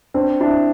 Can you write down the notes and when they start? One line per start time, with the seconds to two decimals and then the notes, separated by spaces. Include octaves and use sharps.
0.14 C4 D4
0.41 D4 E4